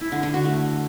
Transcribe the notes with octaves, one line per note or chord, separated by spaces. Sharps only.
E4
D3
D3
F#4
A3